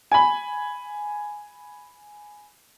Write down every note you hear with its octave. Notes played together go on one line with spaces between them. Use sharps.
G#5 B5